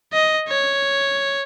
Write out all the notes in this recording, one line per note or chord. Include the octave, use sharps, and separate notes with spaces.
D#5
C#5